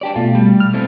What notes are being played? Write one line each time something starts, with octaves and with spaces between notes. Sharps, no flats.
D4 G4 D5
B2 A3 F4
G3
F6
A2 A3 C4